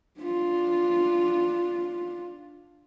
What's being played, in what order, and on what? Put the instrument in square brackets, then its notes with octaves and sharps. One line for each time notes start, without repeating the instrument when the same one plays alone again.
[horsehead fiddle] D4 F4